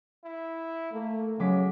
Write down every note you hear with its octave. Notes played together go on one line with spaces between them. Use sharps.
E4
A3 A#3
C#3 F#3 G#3 D6 B6